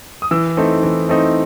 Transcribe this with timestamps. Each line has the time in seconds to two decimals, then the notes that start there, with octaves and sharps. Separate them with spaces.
0.22 D#6
0.31 E3 E6
0.57 A3 C4 D#4
0.83 E3
1.09 A3 C4 D#4